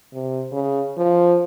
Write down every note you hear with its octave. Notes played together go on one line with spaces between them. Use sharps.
C3
C#3
F3